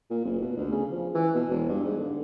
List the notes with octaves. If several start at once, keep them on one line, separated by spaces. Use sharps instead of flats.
A#2
F#1
B2
D2
C#3
F3
E3
B2
E1
G2
G#2
D3